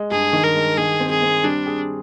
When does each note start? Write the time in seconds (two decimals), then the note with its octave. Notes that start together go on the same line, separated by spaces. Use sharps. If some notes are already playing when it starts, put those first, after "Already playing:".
Already playing: G#3
0.11 G2 G#4
0.33 D#3
0.44 A#4
0.56 G#3
0.77 D#3 G#4
1.00 C4
1.11 G#4
1.22 C4
1.44 G3 D4
1.66 G#4